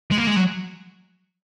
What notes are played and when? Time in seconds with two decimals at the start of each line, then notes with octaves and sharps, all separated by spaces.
0.11 G#3
0.18 A#3
0.27 G#3
0.37 F#3